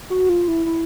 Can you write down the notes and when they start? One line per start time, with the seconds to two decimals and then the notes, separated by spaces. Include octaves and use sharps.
0.10 F#4
0.29 F4
0.48 E4
0.66 E4